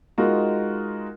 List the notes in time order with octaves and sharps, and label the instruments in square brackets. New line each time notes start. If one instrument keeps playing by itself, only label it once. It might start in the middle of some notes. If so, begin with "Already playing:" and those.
[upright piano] G#3 D#4 F4 F#4 A#4